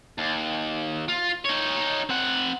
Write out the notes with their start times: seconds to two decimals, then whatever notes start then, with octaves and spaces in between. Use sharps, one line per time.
0.18 D#2
1.08 F4
1.45 D#4 C#5
2.09 C4 F#5